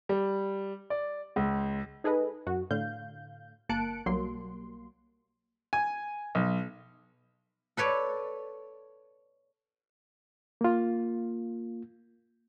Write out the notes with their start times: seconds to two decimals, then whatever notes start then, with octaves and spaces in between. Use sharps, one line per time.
0.09 G3
0.90 D5
1.36 C#2
2.04 D#4 G#4 A4 B4 D#5
2.46 F#2 F#4
2.71 A2 D3 F5 G6
3.69 G1 A#3 A5 F#6 C#7 D7
4.06 B1 F#3 G3 A#3 C6
5.73 G#5
6.35 B1
7.77 A4 B4 C#5 D5
10.61 A#3 F4